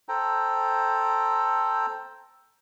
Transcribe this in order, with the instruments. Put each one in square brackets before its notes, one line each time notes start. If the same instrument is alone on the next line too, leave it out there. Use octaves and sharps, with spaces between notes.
[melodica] A4 C5 G5 A#5